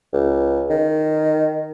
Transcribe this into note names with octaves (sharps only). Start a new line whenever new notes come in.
C#2
D#3